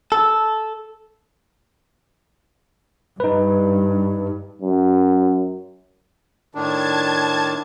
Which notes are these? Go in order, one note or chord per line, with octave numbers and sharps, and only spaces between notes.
A4
G2 D#4 B4
F#2
A2 D#3 D4 A5 G#6